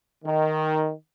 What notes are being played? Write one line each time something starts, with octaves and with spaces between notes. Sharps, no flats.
D#3